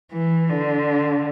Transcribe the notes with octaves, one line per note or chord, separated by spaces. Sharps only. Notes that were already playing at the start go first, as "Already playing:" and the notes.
E3
D3